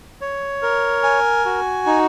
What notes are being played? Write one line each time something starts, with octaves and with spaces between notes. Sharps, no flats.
C#5
A#4
G#5
F#4
D#4